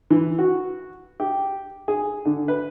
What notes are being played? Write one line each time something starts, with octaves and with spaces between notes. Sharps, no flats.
E3
F#4
G4
G#4
D3
B4